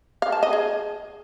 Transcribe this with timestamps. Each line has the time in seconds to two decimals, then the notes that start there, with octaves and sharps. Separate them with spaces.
0.22 F5
0.32 A5
0.43 D#5
0.53 G#4